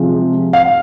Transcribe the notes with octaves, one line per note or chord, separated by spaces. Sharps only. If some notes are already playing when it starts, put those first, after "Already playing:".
Already playing: C3 F3 G#3
F5